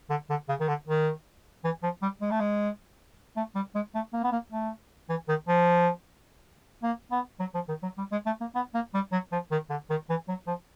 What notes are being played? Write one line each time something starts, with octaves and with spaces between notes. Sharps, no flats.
D3
D3
C#3
D#3
D3
D#3
E3
F3
G3
G#3
A3
G#3
A3
G3
G#3
A3
A#3
B3
A#3
A3
E3
D#3
F3
A#3
B3
F#3
F3
D#3
F#3
G3
G#3
A3
A#3
B3
A#3
G3
F#3
F3
D#3
D3
D#3
E3
F#3
F3